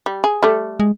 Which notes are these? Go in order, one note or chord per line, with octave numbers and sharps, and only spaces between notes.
G3
G#4
G3 A3
G#3